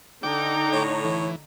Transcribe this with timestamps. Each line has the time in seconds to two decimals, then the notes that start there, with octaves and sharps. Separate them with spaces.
0.23 D3 D#4 G5 A#5 D6
0.72 A2 C#5
1.05 E3